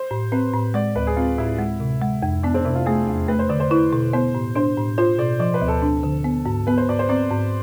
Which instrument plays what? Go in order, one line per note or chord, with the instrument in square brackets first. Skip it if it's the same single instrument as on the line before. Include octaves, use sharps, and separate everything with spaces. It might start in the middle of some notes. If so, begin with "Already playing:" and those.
Already playing: [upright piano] C5
[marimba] A2
[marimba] C4 [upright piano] B4
[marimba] A2
[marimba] G#3 [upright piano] D5
[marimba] D2 [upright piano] B4
[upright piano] G#4
[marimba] C4 [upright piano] F4
[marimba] A2 [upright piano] E4
[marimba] G#3
C3
G#3
F2
[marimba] B3 [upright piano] D4
[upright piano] C4
[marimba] C3 [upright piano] E4
[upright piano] F4
[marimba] A3 [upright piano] G#4
[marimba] E2
[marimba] A3 [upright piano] B4
[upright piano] C5
[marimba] D3 [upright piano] D5
[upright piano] C5
[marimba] E4 [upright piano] B4
[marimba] B2
[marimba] B3 [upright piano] C5
[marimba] A2
[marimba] D4 [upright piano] C5
[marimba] A2
[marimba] F4 [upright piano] C5
[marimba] B2 [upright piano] D5
[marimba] F3 [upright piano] D5
[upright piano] B4
[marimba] D2
[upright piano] A4
[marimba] D4
D3
B3
G#2
[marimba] B3 [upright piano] B4
[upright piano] C5
[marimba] G#2 [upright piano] D5
[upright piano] C5
[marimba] C4 [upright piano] D5
[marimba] G#2